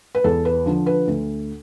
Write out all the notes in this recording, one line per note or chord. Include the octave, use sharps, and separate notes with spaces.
B4
E2 A4
B4
D3 F3
B4
D2